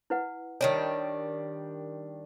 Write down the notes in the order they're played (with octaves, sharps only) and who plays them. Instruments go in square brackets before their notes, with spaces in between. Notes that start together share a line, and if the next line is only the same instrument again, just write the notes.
[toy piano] E4 B4 F#5
[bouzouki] D#3 G3 D4 [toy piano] C#5